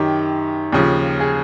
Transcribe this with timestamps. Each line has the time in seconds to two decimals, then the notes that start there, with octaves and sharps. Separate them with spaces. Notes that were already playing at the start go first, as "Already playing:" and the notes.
Already playing: F#2 D#3 G4
0.73 D#2 C#3 F3
1.20 G#4